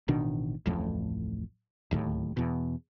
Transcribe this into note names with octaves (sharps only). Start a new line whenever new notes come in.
A1 B2 D#3 D4
D1 A1 F2 A2
D1 D#2 A2
E2 B2